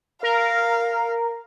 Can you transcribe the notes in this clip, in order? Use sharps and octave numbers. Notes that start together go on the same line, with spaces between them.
A#4 F5